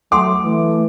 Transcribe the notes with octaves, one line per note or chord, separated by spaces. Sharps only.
F#3 A3 A4 F#5 C6 D6
E3 A3